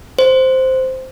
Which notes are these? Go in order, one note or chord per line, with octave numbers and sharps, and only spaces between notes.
C5